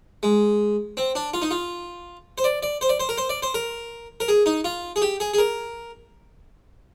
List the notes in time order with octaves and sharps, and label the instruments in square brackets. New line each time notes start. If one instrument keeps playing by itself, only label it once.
[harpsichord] G#3
C4
D4
F4
D#4
F4
C5
D5
D5
C5
D5
C5
A#4
C5
D5
C5
A#4
A#4
G#4
D#4
F4
G#4
G4
G#4
G#4
A#4